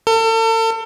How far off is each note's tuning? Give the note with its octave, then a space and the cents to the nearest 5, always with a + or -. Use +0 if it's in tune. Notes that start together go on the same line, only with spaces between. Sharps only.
A4 +40